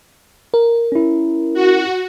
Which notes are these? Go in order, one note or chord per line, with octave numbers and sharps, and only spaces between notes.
A#4
C#4 E4
F#4